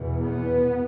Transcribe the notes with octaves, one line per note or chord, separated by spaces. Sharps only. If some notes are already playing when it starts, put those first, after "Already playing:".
Already playing: E2 B2
B3